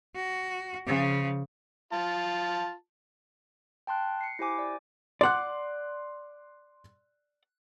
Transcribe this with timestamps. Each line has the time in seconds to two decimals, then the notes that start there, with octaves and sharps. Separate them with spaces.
0.16 F#4
0.87 C#3 F3
1.93 F4 A5
3.87 G5 A5 C6 F#6
4.21 C7 C#7
4.39 E4 G4 C5 G#5 D6
4.59 D5
5.21 D5 F#5 C6 D6 F#6